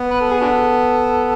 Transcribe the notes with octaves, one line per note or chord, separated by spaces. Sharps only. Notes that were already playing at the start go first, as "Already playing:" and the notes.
Already playing: B3
B4
A4
G#4
D4 F#4 A4